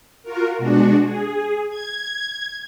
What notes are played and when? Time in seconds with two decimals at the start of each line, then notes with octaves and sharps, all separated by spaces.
0.23 F4 F#4 A#4
0.58 B2 G#3 D4 F#4
1.02 G#4
1.70 G#6